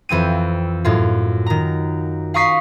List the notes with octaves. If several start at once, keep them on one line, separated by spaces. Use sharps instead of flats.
F2 E3 C4 D#7
F#2 A2 F4
D#3 A#5
F5 A#5 C#6 D#6 B6 C7